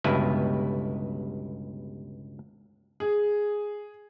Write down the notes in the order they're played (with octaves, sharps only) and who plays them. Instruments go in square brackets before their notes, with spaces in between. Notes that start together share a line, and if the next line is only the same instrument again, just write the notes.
[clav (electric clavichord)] G1 C#2 G2 B2 E4 B4
[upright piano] G#4